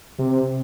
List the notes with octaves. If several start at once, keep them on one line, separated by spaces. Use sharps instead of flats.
C3